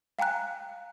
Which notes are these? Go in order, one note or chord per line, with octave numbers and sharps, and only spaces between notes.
F5 G5 G#5 A#5 F#6